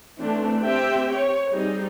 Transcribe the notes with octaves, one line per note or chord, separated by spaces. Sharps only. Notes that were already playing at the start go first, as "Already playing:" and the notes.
E3 A3 C4 D4
C4 G4 E5 G5
C#5
G3 C4 D#4 G#4